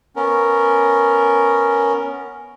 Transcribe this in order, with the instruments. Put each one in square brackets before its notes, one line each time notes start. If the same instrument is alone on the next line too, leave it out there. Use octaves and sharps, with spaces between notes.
[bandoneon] B3 C#4 A#4